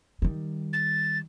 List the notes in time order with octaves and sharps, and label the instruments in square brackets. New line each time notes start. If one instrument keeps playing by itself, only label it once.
[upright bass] D#3 G3
[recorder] A6